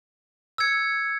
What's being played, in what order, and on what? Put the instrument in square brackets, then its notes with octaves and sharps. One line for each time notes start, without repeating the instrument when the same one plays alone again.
[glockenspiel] E6 G#6 C#7